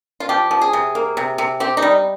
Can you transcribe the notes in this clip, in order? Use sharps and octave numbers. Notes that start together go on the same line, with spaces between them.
F4
F3 G4
F3
G#4
C3
A#3
C3
C3
C4 G4
D#4
G3